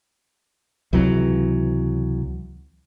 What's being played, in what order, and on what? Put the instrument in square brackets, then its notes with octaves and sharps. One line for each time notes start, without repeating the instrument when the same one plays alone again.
[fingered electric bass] C#2 C3 E3 F#3